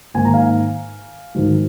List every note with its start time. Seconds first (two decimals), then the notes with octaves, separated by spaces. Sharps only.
0.14 G#2 D#3 A#3 G#5
0.25 A#5
0.34 F5 G#5
1.35 G#2 D#3 F#3